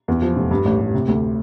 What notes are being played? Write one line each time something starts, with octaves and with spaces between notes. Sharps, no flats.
E2
F3
F1
G2
A1
A1
C3
D2